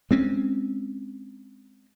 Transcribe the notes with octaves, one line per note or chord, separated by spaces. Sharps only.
G#3 C4 C#4